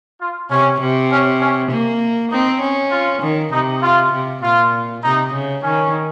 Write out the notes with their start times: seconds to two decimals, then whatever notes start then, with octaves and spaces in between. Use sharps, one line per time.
0.20 F4
0.50 C3 C#4
0.80 C3
1.11 C#4
1.41 C#4
1.71 A#3
2.31 C4 D#4
2.61 C#4
2.92 F4
3.22 D#3
3.52 C3 D#4
3.82 F4
4.12 C3
4.42 A#2 F4
5.03 C3 D#4
5.33 C#3
5.63 D#3 C#4